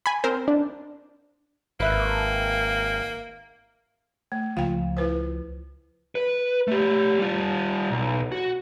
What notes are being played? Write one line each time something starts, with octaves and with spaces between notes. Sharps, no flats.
G#5 B5
C4 A#4 C5
D4
G#1 A#3 B4 E5 F#6
A3
C#2 F3 F5 G5
E4 B4 C5
B4
A3 G4
G3 F4
B1
F#4